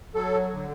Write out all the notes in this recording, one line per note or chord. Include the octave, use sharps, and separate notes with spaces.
F#3 A4
D3